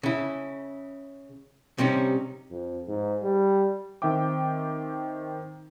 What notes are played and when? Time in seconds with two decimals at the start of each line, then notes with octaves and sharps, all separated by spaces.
0.03 C#3 E4
1.78 C3 G3 C#4 D#4
2.51 F2
2.88 G#2
3.23 G3
4.02 D#3 C4 E5 G5 D6